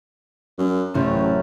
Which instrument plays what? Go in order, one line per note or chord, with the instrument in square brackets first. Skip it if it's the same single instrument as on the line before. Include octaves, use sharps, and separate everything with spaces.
[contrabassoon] F#2
[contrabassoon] A1 [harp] F#2 C3 A3